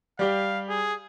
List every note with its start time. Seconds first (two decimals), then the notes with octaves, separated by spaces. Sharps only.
0.19 G3 G4 F5
0.69 G#4